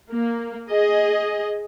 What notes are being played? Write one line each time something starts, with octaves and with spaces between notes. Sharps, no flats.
A#3
G#4 D#5